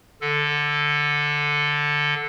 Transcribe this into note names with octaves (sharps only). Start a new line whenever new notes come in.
D3 A4